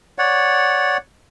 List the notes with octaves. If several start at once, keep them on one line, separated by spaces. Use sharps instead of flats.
C#5 D5 F#5